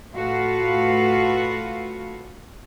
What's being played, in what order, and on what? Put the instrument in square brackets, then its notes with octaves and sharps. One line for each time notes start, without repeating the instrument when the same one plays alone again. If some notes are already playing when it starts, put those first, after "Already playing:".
[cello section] A2 F4 F#4 A4 B4 F5